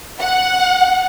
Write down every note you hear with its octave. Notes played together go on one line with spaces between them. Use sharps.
F#5